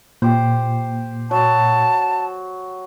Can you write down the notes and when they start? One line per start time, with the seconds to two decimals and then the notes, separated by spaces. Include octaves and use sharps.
0.22 A#2 G4 C5
1.31 F#3 A5